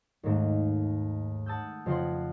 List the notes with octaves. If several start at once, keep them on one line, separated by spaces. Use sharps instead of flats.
D#2 G#2 A3
F#5 A5 D#6 E6 G6
F2 C#3 F4 F#5 C6